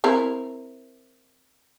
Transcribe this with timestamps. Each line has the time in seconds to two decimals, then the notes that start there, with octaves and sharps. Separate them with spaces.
0.04 C4 E4 A#4